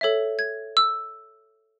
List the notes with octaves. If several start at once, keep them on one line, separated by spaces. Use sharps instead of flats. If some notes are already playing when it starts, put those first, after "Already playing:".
A4 C#5 E5
G#6
E6